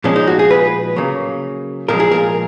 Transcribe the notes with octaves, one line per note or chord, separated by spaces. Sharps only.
A#2 F3 G#3 C#4
D#4
F#4
G#4
B4
C#3 F#3 A#3
A#2 F3 G#3 A#4
G#4
A#4